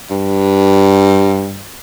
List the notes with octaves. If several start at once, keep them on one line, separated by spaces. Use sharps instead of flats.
G2